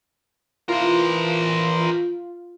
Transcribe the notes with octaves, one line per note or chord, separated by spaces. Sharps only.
E3 F4 A#4 C5